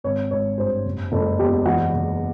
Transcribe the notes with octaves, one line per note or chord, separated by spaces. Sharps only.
G#1 C#5
G#1 C#5
G2 C5
F#1
F#1 A4
E2 G4
E3 F#4
F#1